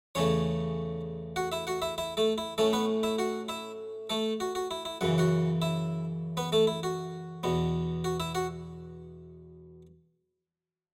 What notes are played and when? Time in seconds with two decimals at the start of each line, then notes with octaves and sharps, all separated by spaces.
0.15 E2 C#3 A3 C#4 C#5
1.36 F#4 F#5
1.52 E4 E5
1.67 F#4 F#5
1.82 E4 E5
1.98 E4 E5
2.17 A3 A4
2.38 E4
2.58 A2 A3 C#4 A4
2.73 B3 B4
3.03 E4 E5
3.19 F#4 F#5
3.49 E4 E5
4.10 A3 A4
4.40 F#4
4.55 F#4
4.71 E4
4.85 E4
5.01 F#2 C#3 E3 F#5
5.18 F#4 F#5
5.62 E4 E5
6.37 B3 B4
6.52 A3 A4
6.67 E4
6.83 F#4
7.43 E2 B2 B3
8.04 F#4
8.20 E4 E5
8.35 F#4 F#5